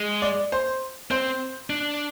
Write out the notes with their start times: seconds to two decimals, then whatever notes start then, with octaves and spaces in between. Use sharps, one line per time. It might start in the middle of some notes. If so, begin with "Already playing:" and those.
Already playing: G#3
0.22 D5
0.52 C5
1.11 C4 C5
1.70 D4